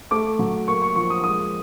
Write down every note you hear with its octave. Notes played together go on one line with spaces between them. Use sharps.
A3 D6
F#3
A#3 C#6
C#6
F3 C#6
D#6
G#3 D#6